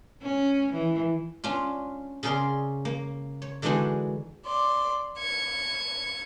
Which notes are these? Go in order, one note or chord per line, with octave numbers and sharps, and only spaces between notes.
C#4
E3
C#4 D4 F4
C#3 C#4 G#4 A#4 D5 C6
A#3
C#5
D3 E3 G#3 D4 D#4 F#4
D5 C6
G#6 C#7